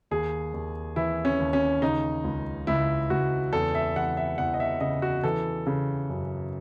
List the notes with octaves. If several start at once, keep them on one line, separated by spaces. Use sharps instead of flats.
D#2 G#4
D#2
E3 E4
C#4
D#2
C#4
C#3 D#4
C#2
C#2 E4
C#2 F#4
E2 A4
E5
E3 F#5
E5
E2 F#5
D#5
E5
C#3 D#5
F#4
E3 A4
C#3
F#2